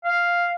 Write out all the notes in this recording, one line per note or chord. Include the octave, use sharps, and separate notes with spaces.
F5